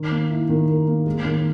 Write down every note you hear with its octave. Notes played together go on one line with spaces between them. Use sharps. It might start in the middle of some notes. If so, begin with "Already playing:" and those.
Already playing: D#3
A#3
E4
D#3
A#4
A#3
G#3
D#3